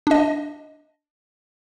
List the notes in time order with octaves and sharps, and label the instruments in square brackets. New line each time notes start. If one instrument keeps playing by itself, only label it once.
[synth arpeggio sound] D4 D#5